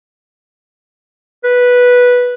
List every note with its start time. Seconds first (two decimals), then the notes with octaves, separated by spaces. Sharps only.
1.44 B4